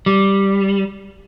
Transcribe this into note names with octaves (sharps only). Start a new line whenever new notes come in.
G3